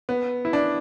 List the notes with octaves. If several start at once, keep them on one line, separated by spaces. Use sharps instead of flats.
B3
E4
D4